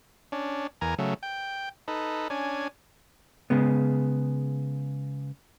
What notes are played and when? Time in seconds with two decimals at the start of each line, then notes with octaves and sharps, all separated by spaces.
0.32 C#4 D4
0.81 E2 A#4 G#5 A#5
0.98 C#3 F#3 A3
1.23 G5
1.88 D#4 A4 B4
2.30 C#4 D4 G#5
3.50 C#3 G#3 B3